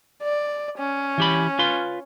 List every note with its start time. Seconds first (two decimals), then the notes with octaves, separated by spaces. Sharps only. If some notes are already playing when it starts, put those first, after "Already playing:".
0.22 D5
0.79 C#4
1.18 E3 G4 B5
1.59 F4 B4 C6